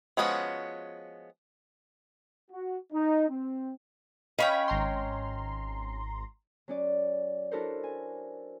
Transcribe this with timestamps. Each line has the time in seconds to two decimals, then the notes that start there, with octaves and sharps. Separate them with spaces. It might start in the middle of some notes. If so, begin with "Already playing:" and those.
0.17 F3 G#3 B3 C#4 F#4
2.51 F#4
2.93 D#4
3.29 C4
4.39 C#4 C#5 D#5 F5 G5 B5
4.68 G#1 A#5 C6
6.68 F#3 C#4 D5
7.52 D4 E4 F#4 A4 A#4 C5
7.83 G#5